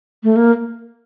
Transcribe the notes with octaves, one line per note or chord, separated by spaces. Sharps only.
A3
A#3